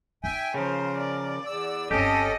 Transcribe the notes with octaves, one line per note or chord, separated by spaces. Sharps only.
D#4 E5 G5 G#5
C#3 F3 A#4 C5
D5
E2 E6
G1 C4 C#4 G4 A4 D#5